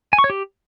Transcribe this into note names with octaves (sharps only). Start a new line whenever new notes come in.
G#5
C#6
C#5
G4